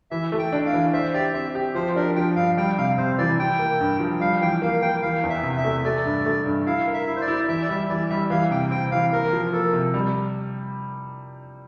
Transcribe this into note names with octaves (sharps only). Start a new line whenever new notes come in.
E3 E5
A3
G5
D4
F5
E3
C5 E5
G4 D5
C4 E5
G4
F3 C5
D4 A#4
F3 G5
G2 F5
G3 G5
C3 F5
C3 C5
E3 D5
E4 G5
A#3
G2
F3
G3 F5
E3 G5
A#3 F5
A#3 G5
E3 F5
E2
E5
C3
E5
A3
A3 D5
G2
A3
G2
E4 F5
A#4
E5
E4
C5
D5
E4
E3 E5
D5
G3 E5
E3 D5
G3 E5
E3 F5
C3 G5
C4 G5
E3 F5
A#3 A#4
F3
A#3 A4
C3
G3